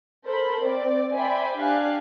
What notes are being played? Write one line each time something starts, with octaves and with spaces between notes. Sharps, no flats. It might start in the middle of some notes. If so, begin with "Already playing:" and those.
A4 A#4 C5 B5
C4 D5
C5 D5 E5 G5 G#5 B5
D4 G4 F5 G#5 F#6